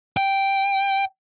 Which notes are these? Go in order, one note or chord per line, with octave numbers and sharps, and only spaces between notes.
G5